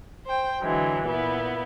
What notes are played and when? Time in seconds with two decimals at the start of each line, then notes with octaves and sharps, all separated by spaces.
0.24 C5 G5
0.61 D3 E3 F#3 G#3
1.03 A#2 B3 E4